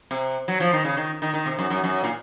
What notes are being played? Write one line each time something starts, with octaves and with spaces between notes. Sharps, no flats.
C3
F#3
F3
D#3
C#3
D#3
D#3
D#3
C3
F#2
F#2
F#2
A#2